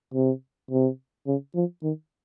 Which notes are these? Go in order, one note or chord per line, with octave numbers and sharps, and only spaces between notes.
C3
C3
C#3
F3
D#3